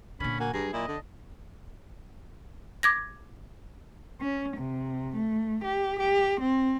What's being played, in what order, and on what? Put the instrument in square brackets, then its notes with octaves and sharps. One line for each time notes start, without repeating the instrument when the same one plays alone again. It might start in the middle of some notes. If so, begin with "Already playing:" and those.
[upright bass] A#2 D3 [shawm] C#4 [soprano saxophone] B5
[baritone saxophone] A#3 [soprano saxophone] F#4 [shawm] G#5
[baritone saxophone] G2 [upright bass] F#3 [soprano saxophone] G#4 [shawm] A#5
[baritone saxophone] A#2 [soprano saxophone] E4 [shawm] D#5
[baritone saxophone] D3 [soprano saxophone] D4
[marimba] D6 G#6 A#6
[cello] C#4
C3
A3
G4
G4
C4